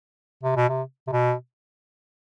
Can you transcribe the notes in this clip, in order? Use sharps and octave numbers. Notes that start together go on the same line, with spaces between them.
C3
B2
C3
C3
B2